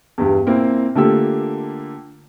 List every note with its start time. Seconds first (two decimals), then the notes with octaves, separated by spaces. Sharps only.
0.18 E2 G2 G3
0.46 A#2 A#3 C4 E4
0.95 D3 A3 A#3 F4 G4 E6